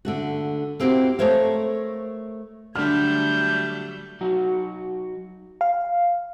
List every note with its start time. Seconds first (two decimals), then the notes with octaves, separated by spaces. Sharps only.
0.05 D3 A3 F#4
0.80 A#3 C4 E4 F#4 G4
1.19 A3 A#4 C5 C#5 E5 F5
2.76 D3 F#3 G3 A3 F6 G6
4.21 F#3 D#4 F#4
5.61 F5